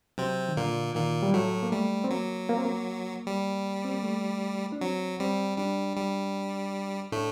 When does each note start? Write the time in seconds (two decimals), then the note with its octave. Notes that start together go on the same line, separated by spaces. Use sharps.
0.18 C3 F#3 C4
0.49 D#3
0.57 A#2 D3 A#3
0.95 A#2 D#3 A#3
1.23 G3
1.34 A2 F#3 A3
1.63 A#3
1.72 G3 A3
2.04 C4
2.10 F#3 A#3
2.49 A#3
2.57 C4
2.65 A#3
3.27 G3
3.85 C4
3.94 A#3
4.04 A3
4.72 D4
4.81 F#3 C4
5.20 G3 C4
5.58 G3 D4
5.97 G3
7.12 A2 A3 D4